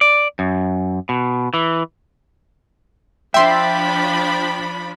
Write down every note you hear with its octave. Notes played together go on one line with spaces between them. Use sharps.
D5
F#2
B2
E3
F3 D4 E5 G5 B5 C6